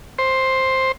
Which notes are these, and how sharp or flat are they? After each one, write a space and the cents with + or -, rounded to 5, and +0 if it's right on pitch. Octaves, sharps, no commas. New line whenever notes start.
C5 +10